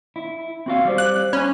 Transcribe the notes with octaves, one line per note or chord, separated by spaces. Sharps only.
E4
C4 F#4 F5
G3 C5
F#6
C#4 G#5 B5